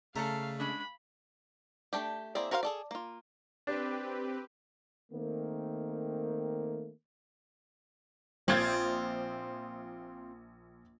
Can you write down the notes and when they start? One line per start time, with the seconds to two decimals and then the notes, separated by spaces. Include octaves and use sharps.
0.16 C#3 A3 A4 D5 F5 A#5
0.60 G#3 C#4 D4 B5
1.93 A3 D4 G4
2.35 A#3 C4 E4 G#4 D5
2.51 F#4 A#4 C5 D5 F5
2.63 G#4 A4 D5
2.91 A#3 F4
3.67 C4 D4 G4 B4
5.12 D#3 A3 A#3 C4
8.48 A#1 C4 F4 G#6 A6